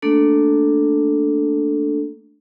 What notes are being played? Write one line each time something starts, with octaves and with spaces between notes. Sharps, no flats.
A3 A#3 D4 A4